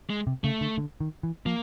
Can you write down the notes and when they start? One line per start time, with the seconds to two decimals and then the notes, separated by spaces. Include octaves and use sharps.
0.10 G#3
0.27 C3
0.44 C#3 A3
0.61 D3
0.78 D3
1.00 D#3
1.23 E3
1.46 F3 A#3